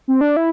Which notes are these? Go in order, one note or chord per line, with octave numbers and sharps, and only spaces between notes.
C4
D4
E4